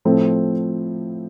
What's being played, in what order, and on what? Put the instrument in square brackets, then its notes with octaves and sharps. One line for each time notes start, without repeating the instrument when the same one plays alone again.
[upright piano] A2 F3 C4 F4 A4